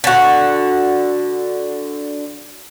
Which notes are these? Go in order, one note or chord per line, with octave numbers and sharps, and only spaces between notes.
D3 F#4